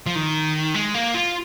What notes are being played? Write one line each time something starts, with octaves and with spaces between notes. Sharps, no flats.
F3
D#3
G#3
A#3
F4